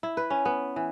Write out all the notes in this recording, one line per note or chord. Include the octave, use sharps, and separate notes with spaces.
E4
B4
C#4
B3
E3